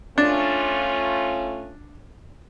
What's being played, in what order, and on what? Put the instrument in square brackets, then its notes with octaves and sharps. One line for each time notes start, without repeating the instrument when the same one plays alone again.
[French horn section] A3 C#4 F4 [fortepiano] D4